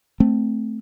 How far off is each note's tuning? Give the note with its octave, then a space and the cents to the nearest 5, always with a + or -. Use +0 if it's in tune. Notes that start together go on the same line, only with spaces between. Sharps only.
A3 +0 C4 +0